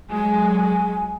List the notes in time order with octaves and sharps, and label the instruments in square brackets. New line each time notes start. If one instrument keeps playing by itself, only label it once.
[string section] F#3 G#3 [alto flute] G#5